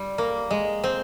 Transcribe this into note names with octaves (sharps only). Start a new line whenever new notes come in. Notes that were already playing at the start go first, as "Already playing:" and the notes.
Already playing: G3
A#3
G#3
C4